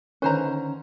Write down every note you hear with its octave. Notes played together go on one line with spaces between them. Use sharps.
D3 D#3 C#4 B4 C5 A#5